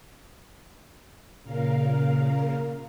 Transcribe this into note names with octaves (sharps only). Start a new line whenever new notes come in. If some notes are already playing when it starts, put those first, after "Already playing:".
A#2 C#3 A#4 F5